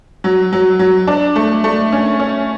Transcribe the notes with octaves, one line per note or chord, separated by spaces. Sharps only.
F#3
F#3
F#3
D4
A3
A3
C#4
C#4